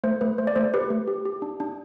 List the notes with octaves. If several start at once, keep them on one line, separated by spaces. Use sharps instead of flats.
A3 C5
A3 B4
A3 C5
D5
A3 C5
G4 B4
A3
G4
G4
D4
D4